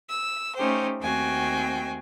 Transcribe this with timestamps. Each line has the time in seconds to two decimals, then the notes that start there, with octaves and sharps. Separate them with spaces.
0.10 E6
0.56 A3 C#4 D#4 G4 C5
1.00 D#2 A3 C4 F#4 G5 G#5